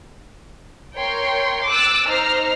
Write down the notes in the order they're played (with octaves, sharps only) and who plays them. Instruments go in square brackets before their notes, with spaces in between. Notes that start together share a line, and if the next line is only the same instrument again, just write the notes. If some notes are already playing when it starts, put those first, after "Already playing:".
[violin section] A#4 C#5 G5 C6
D6 E6 F#6 A6
D#4 C5 A#5 F6 C7